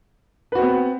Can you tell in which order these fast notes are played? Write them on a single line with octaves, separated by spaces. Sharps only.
B4 F#4 C4 B3